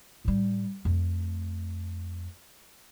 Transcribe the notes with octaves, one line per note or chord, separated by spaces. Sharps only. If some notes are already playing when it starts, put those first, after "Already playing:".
A2 G3
F2 A3